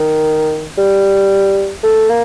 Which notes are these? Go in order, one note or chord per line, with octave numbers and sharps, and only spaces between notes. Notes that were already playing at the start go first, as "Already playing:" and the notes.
Already playing: D#3
G3
A3
A#3